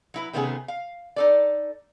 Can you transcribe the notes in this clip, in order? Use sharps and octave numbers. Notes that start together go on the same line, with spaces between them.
F#3 E4 B4
C3 D#3 A3 B3 C#4 G#4
F5
D#4 A4 D5